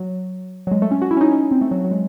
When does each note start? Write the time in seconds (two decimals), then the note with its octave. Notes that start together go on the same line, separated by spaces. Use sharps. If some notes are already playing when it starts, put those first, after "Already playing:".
Already playing: F#3
0.67 F#3
0.71 G#3
0.82 A3
0.91 C#4
1.02 F#4
1.11 E4
1.17 C#4
1.21 D#4
1.32 C#4
1.51 C4
1.62 A3
1.71 F#3
1.84 F#3
1.91 G#3